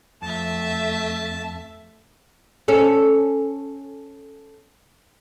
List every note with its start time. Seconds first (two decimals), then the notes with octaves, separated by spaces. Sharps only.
0.22 F2 A3 E5 A5
2.68 C#4 A4